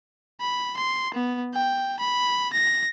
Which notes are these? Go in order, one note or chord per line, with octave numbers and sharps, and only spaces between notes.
B5
C6
B3
G5
B5
A#6